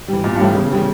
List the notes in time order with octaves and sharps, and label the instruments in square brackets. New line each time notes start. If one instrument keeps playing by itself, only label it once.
[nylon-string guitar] E3 G3
[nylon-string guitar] E2 [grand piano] A#2
[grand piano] G2
[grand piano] A2 [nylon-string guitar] E3 G3
[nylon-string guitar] E2 [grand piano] C#3
[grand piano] C#3 [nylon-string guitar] E3 G3